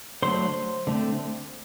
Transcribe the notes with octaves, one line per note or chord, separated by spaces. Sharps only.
D3 F#3 A3 C5 C6
D3 A3 C4